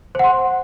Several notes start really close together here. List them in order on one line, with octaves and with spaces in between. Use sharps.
C5 F#5 C6